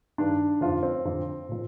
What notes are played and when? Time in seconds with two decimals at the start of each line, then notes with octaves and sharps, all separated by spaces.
0.18 G2 D#3 D4
0.61 F2 D3 F3 F4
0.83 C4
1.05 F2 D3 F3
1.49 A#2 F3